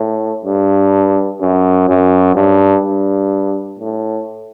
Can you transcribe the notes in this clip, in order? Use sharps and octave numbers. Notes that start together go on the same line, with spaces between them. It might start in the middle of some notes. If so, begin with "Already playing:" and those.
Already playing: A2
G2
F#2
F#2
G2
G2
A2